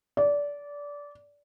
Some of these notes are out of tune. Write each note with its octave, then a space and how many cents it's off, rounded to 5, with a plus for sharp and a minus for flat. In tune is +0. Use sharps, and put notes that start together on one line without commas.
D5 -20